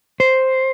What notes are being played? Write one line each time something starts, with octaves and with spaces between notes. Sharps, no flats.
C5